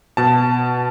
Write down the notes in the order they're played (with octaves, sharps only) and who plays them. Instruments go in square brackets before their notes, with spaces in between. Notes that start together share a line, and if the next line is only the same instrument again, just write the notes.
[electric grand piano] B2 A5